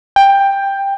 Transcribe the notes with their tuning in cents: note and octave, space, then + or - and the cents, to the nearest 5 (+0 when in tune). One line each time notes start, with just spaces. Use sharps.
G5 +10